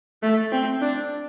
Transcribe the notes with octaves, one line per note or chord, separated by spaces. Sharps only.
A3
C4
D4